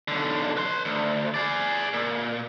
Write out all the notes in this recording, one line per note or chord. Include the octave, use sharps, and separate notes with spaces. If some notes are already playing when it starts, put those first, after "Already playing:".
B1 D3
B4 C6
D2
G#4 D5
A#2